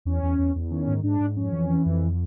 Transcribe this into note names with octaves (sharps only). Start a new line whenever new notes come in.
E2 C#4
E2
E2
E2
D#3 C#4
G#2
G#2 D4
G#2
F2 C#4
E3
E3
F2